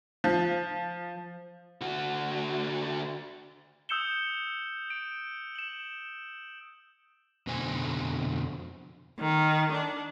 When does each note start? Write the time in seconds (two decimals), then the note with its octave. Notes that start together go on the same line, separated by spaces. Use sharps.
0.24 F3
1.81 D3 F#4
3.89 D#6 E6 G6 C#7 E7 G7
4.90 D7
5.55 E7 F#7
7.47 F2 B2 D3 C5 G#5
9.19 D#3
9.72 D4